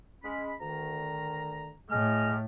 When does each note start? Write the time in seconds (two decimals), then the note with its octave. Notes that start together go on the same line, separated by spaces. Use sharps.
0.24 G#3 C#4 B5
0.61 D2 D#3 A#5
1.91 A2 G#4 D#5 F6